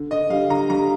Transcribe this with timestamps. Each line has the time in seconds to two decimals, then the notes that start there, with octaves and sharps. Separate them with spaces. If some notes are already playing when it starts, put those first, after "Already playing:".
Already playing: D3
0.11 D3 D#5
0.30 G3 F5
0.50 D3 A#5
0.70 G3 A#5